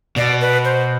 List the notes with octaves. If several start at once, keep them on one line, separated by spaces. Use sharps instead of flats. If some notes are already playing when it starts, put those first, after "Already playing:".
B2 D5
B4
C5